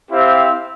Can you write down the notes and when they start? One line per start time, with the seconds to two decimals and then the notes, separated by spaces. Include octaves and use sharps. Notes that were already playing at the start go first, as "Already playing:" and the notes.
0.10 C4 E4 G4 C5 F5